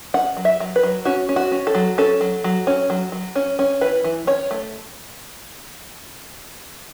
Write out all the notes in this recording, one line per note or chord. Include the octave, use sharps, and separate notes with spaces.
C#4 F#5
F#3
E5
F#3
B4
F#3
C#4 F#4
C#4
F#4
C#4
A4
F#3
C#4 A4
F#3
F#3
C#4
F#3
F#3
C#4
C#4
E3 B4
E3
C#4 C#5
A3